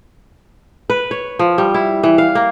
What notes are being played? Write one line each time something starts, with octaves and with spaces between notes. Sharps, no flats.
B4
C#5
F3
G3
E4
E3
F5
A#3